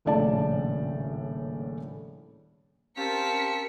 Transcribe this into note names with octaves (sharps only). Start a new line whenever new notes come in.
D#1 A#1 A2 C#3 D5 A5
C4 C#4 G4 A#4 F5 A5 B6 C#7